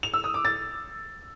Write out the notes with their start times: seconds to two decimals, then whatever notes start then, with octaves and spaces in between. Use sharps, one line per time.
0.03 F7
0.14 E6
0.24 D#6
0.34 D6
0.45 A6